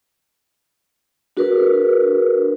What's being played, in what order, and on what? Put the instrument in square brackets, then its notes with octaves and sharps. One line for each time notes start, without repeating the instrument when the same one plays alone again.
[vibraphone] D4 F#4 G#4 A#4 B4